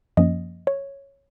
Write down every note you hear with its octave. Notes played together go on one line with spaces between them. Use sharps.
F#2 F3 A#3 C#4 D#5
C#5